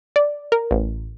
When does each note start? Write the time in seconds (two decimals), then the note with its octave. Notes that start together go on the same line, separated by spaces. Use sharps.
0.16 D5
0.52 A#4
0.71 A1